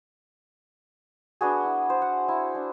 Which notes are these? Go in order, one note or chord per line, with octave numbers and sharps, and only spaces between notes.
B3 D4 F#4 G#4
E4
C5
F#5
E4
D4